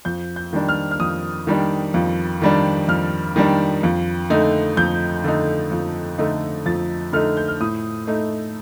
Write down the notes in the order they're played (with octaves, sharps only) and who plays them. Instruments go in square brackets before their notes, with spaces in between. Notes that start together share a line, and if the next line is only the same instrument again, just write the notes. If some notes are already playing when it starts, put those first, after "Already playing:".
[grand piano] F2 G6
G6
D#3 G3 D4
F6
F6
F2 D#6
D#3 G3 D4
F2
D#3 G3 D4
F2 F6
D#3 G3 D4
F2
D3 A3 D#4
F2 G6
D3 A3 D#4
F2
D3 A3 D#4
F2 A6
D3 A3 D#4 F6
G6
F6
A2 D#6
A3 D#4